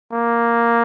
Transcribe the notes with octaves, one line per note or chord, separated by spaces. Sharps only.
A#3